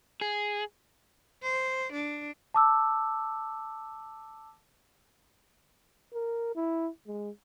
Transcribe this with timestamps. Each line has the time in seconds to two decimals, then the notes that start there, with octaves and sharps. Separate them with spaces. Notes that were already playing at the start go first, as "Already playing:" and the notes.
0.21 G#4
1.43 C5
1.92 D4
2.54 A5 D6 E6
6.13 A#4
6.56 E4
7.07 G#3